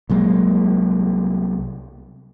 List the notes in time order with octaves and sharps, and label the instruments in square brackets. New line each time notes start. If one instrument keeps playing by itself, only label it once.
[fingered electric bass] C2 F#3 G#3 A#3